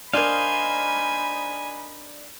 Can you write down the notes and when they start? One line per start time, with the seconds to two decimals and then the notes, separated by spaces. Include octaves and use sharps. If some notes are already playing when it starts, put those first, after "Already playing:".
0.13 D4 D#4 A#4 C5 D#5 F5 G#5 B5